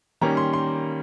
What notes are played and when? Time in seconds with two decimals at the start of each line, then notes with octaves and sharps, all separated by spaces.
0.21 D#3 G3 A#3 C#4 A#5
0.37 C6
0.53 C6